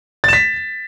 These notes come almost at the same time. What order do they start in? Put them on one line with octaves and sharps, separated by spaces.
A6 E7 B6